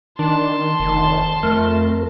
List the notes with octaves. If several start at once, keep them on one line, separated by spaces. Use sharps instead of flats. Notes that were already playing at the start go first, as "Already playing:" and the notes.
D#3 D4 A5 C6
F1 D#3
F2 A3 A#4